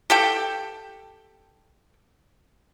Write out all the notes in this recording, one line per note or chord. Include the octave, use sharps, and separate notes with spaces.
G4 A4 G5